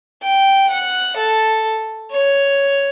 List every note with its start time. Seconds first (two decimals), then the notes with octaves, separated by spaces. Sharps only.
0.23 G5
0.71 F#5
1.18 A4
2.12 C#5